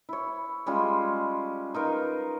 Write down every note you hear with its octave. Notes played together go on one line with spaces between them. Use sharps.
E4 C#5
G3 G#3 C#4 F4
D#4 F4 A#4 B4